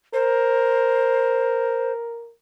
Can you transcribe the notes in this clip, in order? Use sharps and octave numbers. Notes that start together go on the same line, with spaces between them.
A#4 C5